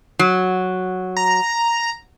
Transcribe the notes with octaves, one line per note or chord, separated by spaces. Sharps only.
F#3
A#5